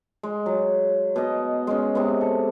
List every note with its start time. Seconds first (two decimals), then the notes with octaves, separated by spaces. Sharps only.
0.23 G#3
0.46 F#3
1.16 B2 D#5
1.67 G#3 C#4
1.95 C3 G#3 B3
2.21 A4